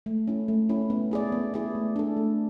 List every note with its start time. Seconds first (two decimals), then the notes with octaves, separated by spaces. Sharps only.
0.06 A3
0.28 C#4 E4
0.48 A3
0.69 C#4 E4
0.90 B3
1.11 E4 G#4 D5
1.32 B3
1.54 E4 G#4 D5
1.75 A3
1.96 D4 A4
2.17 A3